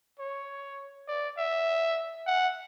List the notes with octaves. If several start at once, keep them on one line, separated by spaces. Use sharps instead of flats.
C#5
D5
E5
F#5